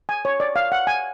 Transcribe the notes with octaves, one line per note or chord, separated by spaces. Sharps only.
G#5
C#5
D5
F5
F#5
G#5